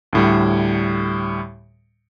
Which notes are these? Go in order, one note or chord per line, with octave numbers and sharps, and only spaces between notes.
D2 A2 G3